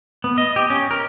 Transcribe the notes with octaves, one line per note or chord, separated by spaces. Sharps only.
B3
D#5
G4
C#4
A#4